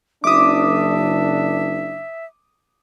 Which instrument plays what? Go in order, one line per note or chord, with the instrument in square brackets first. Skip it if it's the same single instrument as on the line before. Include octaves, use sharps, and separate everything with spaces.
[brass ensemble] F#1 D4 [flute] E5 [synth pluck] D6 D#6